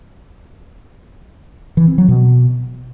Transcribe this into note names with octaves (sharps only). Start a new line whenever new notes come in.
E3
C4
F#3
B2